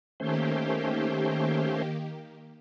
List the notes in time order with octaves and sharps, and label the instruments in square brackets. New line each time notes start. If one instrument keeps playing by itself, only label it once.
[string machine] D#3 A#3 G4 [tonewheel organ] A3 C#4 C5